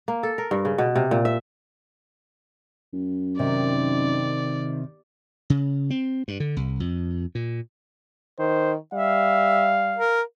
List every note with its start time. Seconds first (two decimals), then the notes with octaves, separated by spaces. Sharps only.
0.08 A#3
0.23 A4
0.38 A#4
0.51 G2
0.65 C#3
0.78 B2
0.96 C3
1.11 A#2
1.25 E5
2.93 F#2
3.39 C3 D#3 D5
5.50 C#3
5.90 C4
6.28 G2
6.40 D3
6.57 C2
6.80 F2
7.35 A#2
8.39 D#3 C5
8.94 G3 E5 F5
9.97 A#4